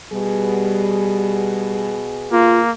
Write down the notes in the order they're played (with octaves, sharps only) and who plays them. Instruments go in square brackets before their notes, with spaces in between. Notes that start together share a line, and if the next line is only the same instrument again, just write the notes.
[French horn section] B2 B3 G#4 [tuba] G3
[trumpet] A#3 [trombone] F4